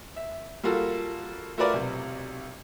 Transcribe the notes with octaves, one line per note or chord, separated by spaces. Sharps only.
E5
G3 A#3 F4 F#4 A4
A3 F4 F#4 A#4 B4 D5
B1 C3